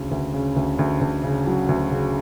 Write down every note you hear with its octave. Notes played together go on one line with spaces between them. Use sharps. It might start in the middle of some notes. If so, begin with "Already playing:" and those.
Already playing: D2 C#3
D2
C#3
D2
D2
D2
C#3
F#3
D2
C#3